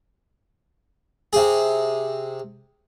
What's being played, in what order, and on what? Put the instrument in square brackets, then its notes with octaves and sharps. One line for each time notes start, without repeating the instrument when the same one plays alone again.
[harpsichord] C3 G#4